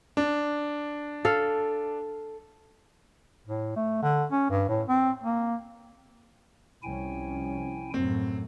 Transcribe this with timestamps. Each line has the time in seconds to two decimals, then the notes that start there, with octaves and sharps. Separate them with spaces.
0.17 D4
1.25 A4 F5
3.47 A2
3.76 A3
4.03 D3
4.32 C#4
4.50 G2
4.69 A2
4.88 C4
5.24 A#3
6.83 C2 F3 C#4 E4 G5 G#5
7.94 F#2 A2 C4